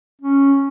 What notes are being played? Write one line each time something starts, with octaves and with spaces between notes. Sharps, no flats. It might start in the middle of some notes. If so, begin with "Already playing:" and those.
C#4